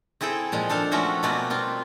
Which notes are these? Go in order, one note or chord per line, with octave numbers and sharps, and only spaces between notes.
C4 E4 G#4 A4 G5
A#2 F3 G#3
D4 A4 C5 F5
F3 A3 C4 C#4 F#4 E5
B2 A3 A#3 C4 B4 D5
G3 C4 F4